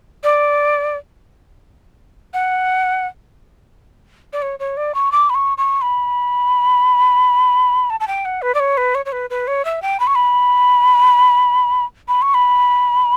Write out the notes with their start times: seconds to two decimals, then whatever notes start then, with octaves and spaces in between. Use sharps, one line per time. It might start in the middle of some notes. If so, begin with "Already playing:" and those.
0.24 D5
2.34 F#5
4.33 D5
4.42 C#5
4.59 C#5
4.77 D5
4.95 C#6
5.12 D6
5.30 B5
5.35 C#6
5.58 C#6
5.82 B5
7.90 A5
8.00 A5
8.08 G5
8.25 F#5
8.42 B4
8.55 D5
8.60 C#5
8.77 B4
8.95 C#5
9.06 C#5
9.12 B4
9.30 B4
9.47 C#5
9.65 E5
9.82 G5
10.00 B5
10.07 C#6
10.15 B5
12.08 B5
12.22 C#6
12.34 B5